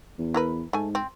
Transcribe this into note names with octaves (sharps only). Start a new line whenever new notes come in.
E2
E4 A#4 B4
G#2 A3 G#5
C4